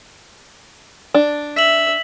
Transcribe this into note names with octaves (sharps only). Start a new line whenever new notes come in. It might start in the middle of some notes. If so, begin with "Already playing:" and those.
D4
E5 B6 F#7